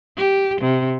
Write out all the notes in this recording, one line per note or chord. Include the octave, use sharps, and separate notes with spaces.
G4
C3